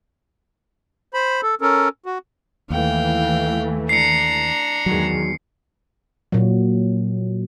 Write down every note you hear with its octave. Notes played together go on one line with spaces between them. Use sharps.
C5 B5
A4
C#4 A4 A#4
F#4
D#2 E3 A3 F5 G5
D4 A#5 C7 C#7
E2 D#3 F#3 G#3
A#2 F#3